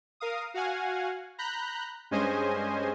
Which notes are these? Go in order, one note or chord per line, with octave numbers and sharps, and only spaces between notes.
A#4 F5 D#6
F#4 F5 F#5 G#5
A#5 B5 F#6 G6
G2 G#3 C#4 C5 D#5 G#5